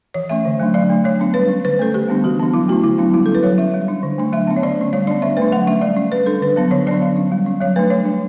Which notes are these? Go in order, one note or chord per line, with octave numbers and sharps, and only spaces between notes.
E3 C#5
A3 C#4 E5
D3
F#3 A3 D4
F#3 D5
A3 D4
F#3 C#5
B3 D4
G3 B4
C#4
D3 B4
A3 C#4 A4
D3 G4
G3 B3 D4
E3 F#4
B3 D4
F#3 E4
A3 C#4 F#4
D3 E4
F#3 B3 D4
G3 E4
C#4 A4
B4
F#3 C#5
C#4 E5
G3
D4
D3
A3 D4
F#3 E5
B3 D4
C#5
D3 D5
A3 C#4
G3 C#5
B3 D4 D5
D3 E5
A3 D4 B4
F#3 F#5
A3 C#4 E5
G3 D5
C#4
G3 B4
D4 A4
D3 B4
F#3 B3 D4
D3 C#5
F#3 B3 D4 D5
F#3
C#4
G3
C#4
F#3 C#5
A3 D4 B4
G3 C#5
D4